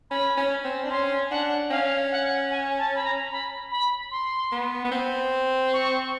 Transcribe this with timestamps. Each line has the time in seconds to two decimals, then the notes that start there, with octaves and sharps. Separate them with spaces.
0.10 C#4 B5
0.37 C#4
0.64 C4
0.84 D4
0.91 C#4 C6
1.31 D4 F#5
1.71 C#4 F5
2.12 F#5
2.51 G#5
2.78 A5
2.95 B5
3.04 A#5
3.32 B5
3.71 B5
4.11 C6
4.52 B3
4.85 B3
4.92 C4
5.73 C#6